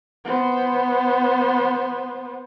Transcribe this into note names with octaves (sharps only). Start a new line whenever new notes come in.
B3 C5